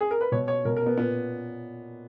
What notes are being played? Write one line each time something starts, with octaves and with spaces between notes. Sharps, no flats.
G#4
A#4
B4
B2 C#5
C#5
B2 A#4
A#4
B3
A#2 B3